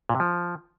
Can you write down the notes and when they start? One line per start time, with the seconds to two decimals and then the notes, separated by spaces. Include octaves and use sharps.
0.09 A#2
0.15 C3
0.20 F3